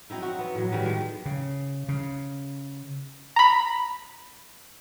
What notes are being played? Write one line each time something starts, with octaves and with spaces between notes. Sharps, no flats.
F#3 C4 D#4 E4
F#4
B3
A2 F#3
A2 D#3 G3 B4
G#3 A3
C#3
C#3
A#5 B5